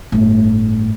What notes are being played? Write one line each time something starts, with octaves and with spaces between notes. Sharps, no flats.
G1 A2